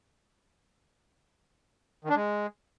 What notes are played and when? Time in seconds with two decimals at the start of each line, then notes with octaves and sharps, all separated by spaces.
2.04 D#3
2.10 D4
2.15 G#3